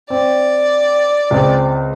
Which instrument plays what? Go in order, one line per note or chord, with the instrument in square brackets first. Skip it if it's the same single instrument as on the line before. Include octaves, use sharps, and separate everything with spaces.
[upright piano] C4 [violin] D5
[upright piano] C#2 C4